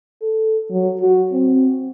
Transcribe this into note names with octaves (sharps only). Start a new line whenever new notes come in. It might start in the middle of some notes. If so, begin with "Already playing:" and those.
A4
F#3
F#4
C4